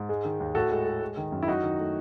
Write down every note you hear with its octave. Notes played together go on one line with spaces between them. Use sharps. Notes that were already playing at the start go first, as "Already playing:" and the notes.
Already playing: G#2
G#3
D#3
D#2
A2 F#4 A4
G#3
G#3
G#3
D#3
F#2
E4
F#3 D#4 F#4
D#3
A3